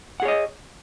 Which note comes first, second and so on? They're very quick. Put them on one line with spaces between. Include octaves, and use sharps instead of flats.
F#5 G#4 C#5 D#5